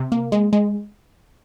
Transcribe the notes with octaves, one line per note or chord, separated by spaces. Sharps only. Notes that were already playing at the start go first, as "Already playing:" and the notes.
Already playing: C3
A#3
G#3
G#3